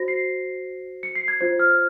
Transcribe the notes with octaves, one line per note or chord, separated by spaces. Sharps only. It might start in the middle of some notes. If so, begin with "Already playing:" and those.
Already playing: F#4 C5 A#6
C7
C#7
C7
G#6
F4 C5 G#6
F6